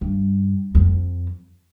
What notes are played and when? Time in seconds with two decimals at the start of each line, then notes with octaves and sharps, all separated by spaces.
0.01 G2
0.75 F2